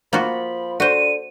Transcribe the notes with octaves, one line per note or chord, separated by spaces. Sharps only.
F3 A#3 F4 F#4 B5
D3 F#4 C5 D#7